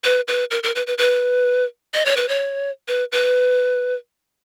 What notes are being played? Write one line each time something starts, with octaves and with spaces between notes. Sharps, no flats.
B4
B4
A#4
A#4
B4
B4
B4
D#5
C#5
B4
C#5
B4
B4